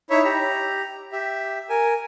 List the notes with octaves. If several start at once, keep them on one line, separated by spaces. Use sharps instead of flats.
D#4 E4 C#5 E5
G4 A#5
G4 E5
A#4 G#5